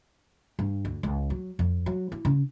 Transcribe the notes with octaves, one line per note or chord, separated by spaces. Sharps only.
G2
D2
C#2
F#3
F2
F#3
E4
C#3